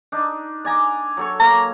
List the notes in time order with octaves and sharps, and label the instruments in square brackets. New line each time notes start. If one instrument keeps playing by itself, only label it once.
[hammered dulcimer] D4 D#4
D5 G#5 A#5
F#3 A4 C#5
[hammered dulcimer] A#3 [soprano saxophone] A#5